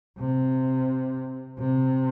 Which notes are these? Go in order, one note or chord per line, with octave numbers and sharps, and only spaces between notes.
C3
C3